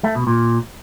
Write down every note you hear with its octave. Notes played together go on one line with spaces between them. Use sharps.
A3
B2
A#2